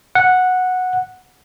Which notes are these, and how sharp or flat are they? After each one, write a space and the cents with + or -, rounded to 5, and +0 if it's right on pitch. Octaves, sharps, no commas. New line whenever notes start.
F#5 -10